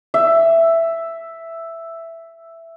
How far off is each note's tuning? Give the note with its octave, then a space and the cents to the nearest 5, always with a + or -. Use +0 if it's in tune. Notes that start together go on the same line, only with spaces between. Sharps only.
E5 +5